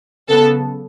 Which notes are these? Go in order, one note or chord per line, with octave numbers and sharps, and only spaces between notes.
C#3 F#3 B3 A4